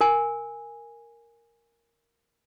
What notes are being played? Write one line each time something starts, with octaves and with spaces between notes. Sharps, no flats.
A#4 G#5